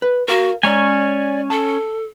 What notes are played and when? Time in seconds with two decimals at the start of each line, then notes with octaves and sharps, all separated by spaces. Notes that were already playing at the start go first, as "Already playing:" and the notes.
0.02 B4
0.28 F#4 A#4 F5
0.63 G#3 C#4 C#5 D5 G#5 A#5
1.50 A4 A5